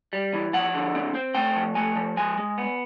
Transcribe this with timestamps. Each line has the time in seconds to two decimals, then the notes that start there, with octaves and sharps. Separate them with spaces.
0.13 G3
0.34 E3
0.53 F3 F#5
0.74 D3
0.95 C4
1.15 C4
1.35 A3 G5
1.56 F3
1.75 A3 G#5
1.96 F3
2.17 G#3 G#5
2.38 G#3
2.58 B3